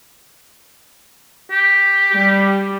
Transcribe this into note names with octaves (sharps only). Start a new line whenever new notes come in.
G4
G3